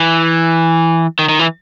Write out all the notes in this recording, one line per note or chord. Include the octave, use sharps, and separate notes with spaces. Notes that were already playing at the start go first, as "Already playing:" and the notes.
Already playing: E3
D#3
D#3
E3